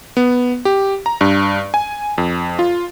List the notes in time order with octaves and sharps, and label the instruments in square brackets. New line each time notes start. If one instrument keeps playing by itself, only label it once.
[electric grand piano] B3
G4
A#5
G2
G#5
F2
F4